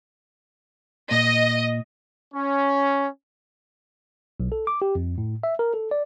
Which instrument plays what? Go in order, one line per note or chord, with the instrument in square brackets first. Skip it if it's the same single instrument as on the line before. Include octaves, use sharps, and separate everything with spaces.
[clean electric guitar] A#2 [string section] D#5
[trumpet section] C#4
[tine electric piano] B1
A4
D6
G4
F2
A2
E5
A#4
A4
D5